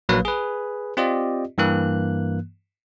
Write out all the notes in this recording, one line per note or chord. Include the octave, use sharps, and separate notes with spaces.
A#1 F#3 A#3 B4 F5
G#4 B4
C4 F4 G4 D5 D#5
G2 E3 A#3 F#6